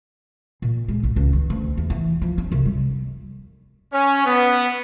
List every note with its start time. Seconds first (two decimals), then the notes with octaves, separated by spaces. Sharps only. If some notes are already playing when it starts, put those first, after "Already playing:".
0.62 A#2
0.88 G#3
1.03 A#1
1.16 C#2
1.33 D#3
1.50 D2
1.77 E2
1.90 E3
2.22 F3
2.38 C#4
2.52 C2
2.65 G3
3.93 C#4
4.26 B3